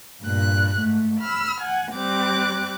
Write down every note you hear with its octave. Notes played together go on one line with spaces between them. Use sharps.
G2 A#2 F#6
G#2 A3
B5 E6 F6
F#5 G#5
G3 C4 D6 F#6